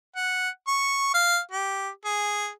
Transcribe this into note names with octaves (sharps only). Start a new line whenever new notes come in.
F#5
C#6
F5
G4
G#4